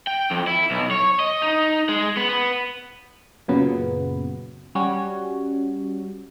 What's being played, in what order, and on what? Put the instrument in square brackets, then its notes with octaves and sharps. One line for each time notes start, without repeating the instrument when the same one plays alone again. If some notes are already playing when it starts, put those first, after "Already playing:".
[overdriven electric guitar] G5
F2
E4
B1
C#5
D#5
D#4
G#3
B3
B3
[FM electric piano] F#2 A#2 C#3 F#3 B3
G3 C#4 F#4 C#5